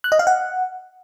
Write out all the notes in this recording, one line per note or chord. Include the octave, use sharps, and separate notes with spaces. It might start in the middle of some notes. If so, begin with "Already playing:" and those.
F#6
D#5
F5
F#5